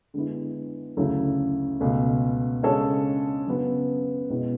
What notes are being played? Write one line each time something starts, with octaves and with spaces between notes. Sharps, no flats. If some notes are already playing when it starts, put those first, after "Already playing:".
D3 G#3 B3 E4
D2 C#3 F#3 A3 E4
C#2 B2 A3
C#3 G#3 D4 A4 C#5
C#3 F#3 B3
B2 G#3 B3 E4